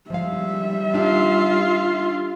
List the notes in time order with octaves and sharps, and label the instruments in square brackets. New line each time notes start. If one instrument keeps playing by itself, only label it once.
[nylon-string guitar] F3 G#3 F5 [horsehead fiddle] G3 E5
[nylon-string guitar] D4 D#4 G4 [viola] F4